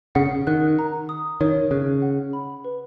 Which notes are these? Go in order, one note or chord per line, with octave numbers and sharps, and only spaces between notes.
C#3 F#5
D#3 F#6
A#5
D#6
D#3 C#5
C#3 F#6
F#5
B5
B4